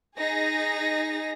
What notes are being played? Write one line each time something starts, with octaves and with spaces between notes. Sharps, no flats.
D#4 G#4 A#6